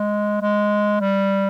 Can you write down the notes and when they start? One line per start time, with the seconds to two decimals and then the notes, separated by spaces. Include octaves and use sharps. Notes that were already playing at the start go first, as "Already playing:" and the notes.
Already playing: G#3
0.41 G#3
1.00 G3